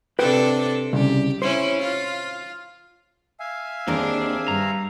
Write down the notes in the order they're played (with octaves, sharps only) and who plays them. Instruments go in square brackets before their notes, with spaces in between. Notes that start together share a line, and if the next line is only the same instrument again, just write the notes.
[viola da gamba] C3 D4 A4 [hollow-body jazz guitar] B4 C5 G5
[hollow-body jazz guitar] C2 C#3 [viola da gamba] G4
[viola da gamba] C#4 E4 [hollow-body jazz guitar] C5
[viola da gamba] F4
[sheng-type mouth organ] E5 F5 G#5
[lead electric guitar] D#2 [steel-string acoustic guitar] C4 G#4 A#4 [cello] D4
[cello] G2 [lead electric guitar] A#5